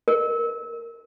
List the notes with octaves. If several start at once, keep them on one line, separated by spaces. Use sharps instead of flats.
A#4